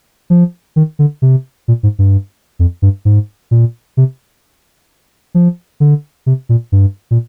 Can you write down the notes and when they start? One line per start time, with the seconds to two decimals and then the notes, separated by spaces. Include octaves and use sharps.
0.30 F3
0.76 D#3
0.99 D3
1.22 C3
1.68 A#2
1.83 G#2
1.99 G2
2.59 F2
2.82 G2
3.05 G#2
3.51 A#2
3.97 C3
5.34 F3
5.80 D3
6.26 C3
6.49 A#2
6.72 G2
7.11 A#2